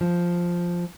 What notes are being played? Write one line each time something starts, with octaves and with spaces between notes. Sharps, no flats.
F3